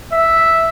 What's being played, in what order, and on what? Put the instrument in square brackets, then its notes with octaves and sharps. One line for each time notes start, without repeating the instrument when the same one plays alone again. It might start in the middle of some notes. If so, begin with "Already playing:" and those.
[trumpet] E5